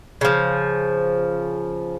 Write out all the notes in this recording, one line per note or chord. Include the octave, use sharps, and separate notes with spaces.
C#3 F3